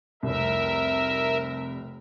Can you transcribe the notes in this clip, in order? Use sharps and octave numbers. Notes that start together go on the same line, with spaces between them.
F1 C2 A#4 E5